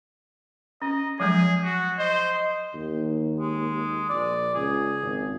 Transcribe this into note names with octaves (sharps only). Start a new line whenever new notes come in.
C#4 D#5
F3 F#3 G#3 G#4
F#4
C5 D#5
D#2
G#3
A#1 D5
C#2 G#4
G#1